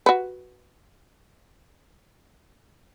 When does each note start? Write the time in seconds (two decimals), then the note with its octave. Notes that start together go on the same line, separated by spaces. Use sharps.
0.06 F#4 B4